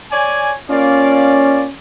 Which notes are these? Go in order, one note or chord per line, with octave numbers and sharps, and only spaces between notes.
C#5 D5 G#5
A#3 C#4 F4 D5